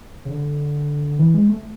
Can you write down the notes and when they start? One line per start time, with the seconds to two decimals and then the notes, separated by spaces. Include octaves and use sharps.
0.25 C#3
0.30 D3
1.19 E3
1.34 G#3
1.49 A3